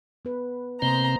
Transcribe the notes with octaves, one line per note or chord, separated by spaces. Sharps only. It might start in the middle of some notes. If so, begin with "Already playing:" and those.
B3 B4
C3 A#3 C4 C5 D#5 A#5